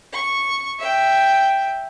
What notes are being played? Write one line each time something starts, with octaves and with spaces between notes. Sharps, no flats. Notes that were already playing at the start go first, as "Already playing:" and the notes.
C#6
E5 G5